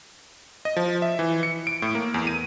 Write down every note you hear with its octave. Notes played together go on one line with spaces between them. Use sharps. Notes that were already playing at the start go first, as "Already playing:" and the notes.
D#5
F3
E5
E3
C#7
D7
A2
A#3
E2
D#7